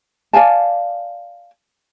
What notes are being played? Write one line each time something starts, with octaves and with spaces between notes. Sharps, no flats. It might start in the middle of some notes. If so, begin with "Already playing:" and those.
D5 F5 G#5 A5